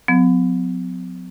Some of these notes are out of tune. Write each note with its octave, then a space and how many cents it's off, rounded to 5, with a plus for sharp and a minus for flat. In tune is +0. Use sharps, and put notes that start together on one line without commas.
F#3 -35 B3 +45